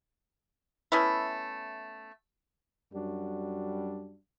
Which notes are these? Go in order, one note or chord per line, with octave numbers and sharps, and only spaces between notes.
A3 B3 C#4 E4
F#2 G3 D4 F#4